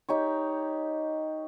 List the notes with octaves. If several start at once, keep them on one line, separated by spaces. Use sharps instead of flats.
D#4 G4 C#5